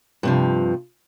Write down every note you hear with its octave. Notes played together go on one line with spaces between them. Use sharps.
G2 C3 F3